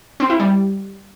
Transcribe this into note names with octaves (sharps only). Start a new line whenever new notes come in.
C4
E4
G3